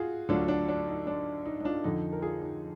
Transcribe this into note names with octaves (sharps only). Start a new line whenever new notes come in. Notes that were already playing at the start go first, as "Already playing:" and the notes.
Already playing: F4 F#4 G#4
D2 D3 F#3 D4 F4
D4
D4
D#4
D4
D#4
D#4
D4 F4
F2 D3 F3 D#4
A#4
F4 G#4
D#4